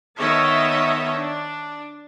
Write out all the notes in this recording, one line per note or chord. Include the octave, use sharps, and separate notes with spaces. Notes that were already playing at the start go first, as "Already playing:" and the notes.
D#3 B3 C#5 D#5 E5 A5
D4